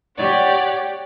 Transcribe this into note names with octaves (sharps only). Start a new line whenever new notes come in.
G4 C#5 D5 F#5